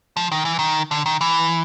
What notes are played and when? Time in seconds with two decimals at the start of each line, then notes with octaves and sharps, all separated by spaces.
0.17 F3
0.32 D#3
0.45 E3
0.59 D#3
0.91 D3
1.06 D#3
1.21 E3